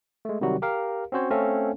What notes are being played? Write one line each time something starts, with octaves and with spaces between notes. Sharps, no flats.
G#3 A3
C3 D#3 F#3 G3 F#4
G4 A#4 F5
C4 C#4 F#4 C5 C#5
A3 C4 C#4 A4 F5